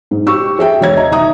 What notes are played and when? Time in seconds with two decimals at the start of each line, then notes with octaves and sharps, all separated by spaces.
0.11 G#2
0.27 G4 C#6 E6
0.58 F#4 G#4 E5 G5
0.81 E1 C#5 G#6
0.96 D#5 A#5
1.11 D#3 E5 A#5 D#6